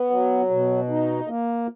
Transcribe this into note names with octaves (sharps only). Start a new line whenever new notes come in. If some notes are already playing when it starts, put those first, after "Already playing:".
Already playing: B3
F#3
B2
D#4
A#3